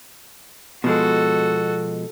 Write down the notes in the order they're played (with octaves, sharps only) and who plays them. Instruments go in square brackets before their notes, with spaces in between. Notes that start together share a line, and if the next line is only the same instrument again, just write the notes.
[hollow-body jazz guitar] B2 F3 G#3 [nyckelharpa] F#4 A4